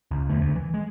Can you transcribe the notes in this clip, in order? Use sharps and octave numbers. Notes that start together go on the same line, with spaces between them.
C#2
E2 D3 A3
D2
E3
G#3